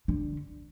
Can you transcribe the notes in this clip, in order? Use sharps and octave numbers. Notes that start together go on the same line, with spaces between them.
D3